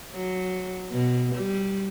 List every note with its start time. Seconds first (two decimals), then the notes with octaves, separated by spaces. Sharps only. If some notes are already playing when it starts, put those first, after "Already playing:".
0.13 F#3
0.92 B2
1.36 G3